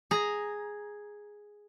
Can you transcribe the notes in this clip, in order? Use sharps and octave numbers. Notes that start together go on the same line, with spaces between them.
G#4 A#5